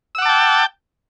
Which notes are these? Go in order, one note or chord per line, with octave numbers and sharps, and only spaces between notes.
F#5 G5 A5 D6 E6